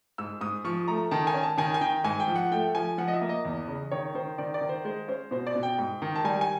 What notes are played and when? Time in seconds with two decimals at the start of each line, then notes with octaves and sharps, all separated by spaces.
0.18 G#2 E6
0.41 G#2 D#6
0.64 F3 C#6
0.88 A3 A#5
1.11 D#3 A5
1.27 G#5
1.34 C#4
1.43 A5
1.58 D#3 G#5
1.74 G#5
1.81 D#3 G5
2.04 G#2 G#5
2.20 G5
2.28 F3
2.36 F#5
2.52 A3 G5
2.75 F3 G#5
2.98 F3 F#5
3.08 D#5
3.14 E5
3.21 A#3
3.29 D#5
3.45 E2
3.68 C#3
3.92 D#3 C#5
4.14 D#3 C5
4.38 D#3 D5
4.54 D5
4.61 D#3
4.69 C5
4.85 G#3 C5
5.08 C#4 C5
5.31 B2 C5
5.47 D5
5.55 B2
5.63 G5
5.78 G#2
6.02 D#3
6.16 A5
6.24 G3 G#5
6.41 G#5